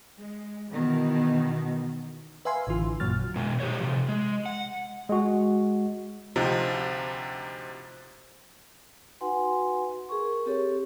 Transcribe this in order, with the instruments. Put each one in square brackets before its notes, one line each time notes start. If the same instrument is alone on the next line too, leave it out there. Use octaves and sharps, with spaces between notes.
[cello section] G#3
B2 D#3 E3
[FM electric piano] B4 E5 F5 G#5 C6
A1 D3 E3 F4
F#2 A#2 F#3 F6 A6
[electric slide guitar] B2 G#3
D#4 G4 A4 C5 C#5
C3 F3
G#3
F#5
[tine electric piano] G#3 F#4
[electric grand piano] D2 C3 F3 D#4
[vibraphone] D#4 F#4 B4 F#5 G#5 C6
G#4 A#4 C#6
C4 G4 A4 C#5